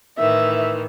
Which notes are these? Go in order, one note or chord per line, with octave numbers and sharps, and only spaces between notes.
A2 D#3 E3 E5